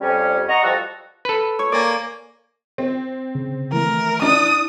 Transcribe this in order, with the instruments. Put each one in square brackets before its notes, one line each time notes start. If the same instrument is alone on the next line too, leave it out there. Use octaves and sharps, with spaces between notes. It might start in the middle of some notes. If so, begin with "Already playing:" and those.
[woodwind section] F2 G3 C#4
D#5 F#5 A#5 C#6
F3 G3 F#4 A4
[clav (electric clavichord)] A4 B4
[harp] C#5
[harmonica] A#3 [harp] D5 G#5
[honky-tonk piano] C4
[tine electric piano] C#3
[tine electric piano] E3 A3 [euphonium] E4 [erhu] A#4
[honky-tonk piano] D4 [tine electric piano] D5 [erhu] D#6